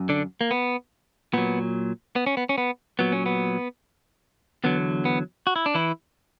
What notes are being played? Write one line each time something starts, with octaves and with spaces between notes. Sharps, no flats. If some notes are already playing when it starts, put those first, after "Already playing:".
Already playing: F#2
D3 D4
A#3
B3
A#2 F#3 B3
B3
C#4
B3
C#4
B3
A#2 F#3 B3
C#4
B3
E2 D3 F#3 B3
B3
F#4
E4
D4
E3 E4